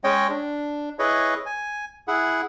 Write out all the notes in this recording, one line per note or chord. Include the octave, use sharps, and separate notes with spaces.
G#3 C#4 C#5 D#5 G5
D4
E4 G#4 B4 C#5 D#5
G#5
E4 G#4 F#5